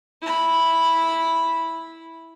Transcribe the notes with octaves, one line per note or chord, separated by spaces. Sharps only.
E4 B5